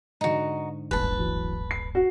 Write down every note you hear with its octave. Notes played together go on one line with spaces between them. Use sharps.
G#2 D3 D#4 F#4
D1 G1 B4 A5
E3 F#3
C7
F#4